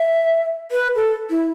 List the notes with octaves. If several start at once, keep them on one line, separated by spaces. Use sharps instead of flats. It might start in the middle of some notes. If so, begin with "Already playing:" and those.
Already playing: E5
B4
A4
E4